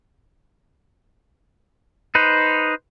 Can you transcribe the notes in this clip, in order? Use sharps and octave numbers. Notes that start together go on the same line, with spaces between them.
D#4 B4 C5